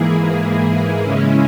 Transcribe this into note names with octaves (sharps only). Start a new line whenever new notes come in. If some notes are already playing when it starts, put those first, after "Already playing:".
Already playing: G#2 E3 A#3 E4 G#4
C#3 G#3 C#4 E4